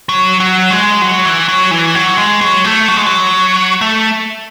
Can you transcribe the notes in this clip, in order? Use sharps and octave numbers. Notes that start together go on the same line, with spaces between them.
F#3
F#3
G#3
F#3
E3
F#3
E3
F#3
G#3
F#3
A3
F#3
G#3
F#3
A3